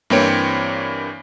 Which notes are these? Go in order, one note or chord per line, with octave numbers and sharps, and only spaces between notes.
G2 E3 A#3 C4 C#5 D7